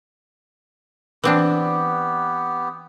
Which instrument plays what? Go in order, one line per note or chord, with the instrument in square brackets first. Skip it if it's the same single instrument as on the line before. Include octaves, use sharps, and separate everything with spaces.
[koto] E3 C4 D4 [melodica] B3 G4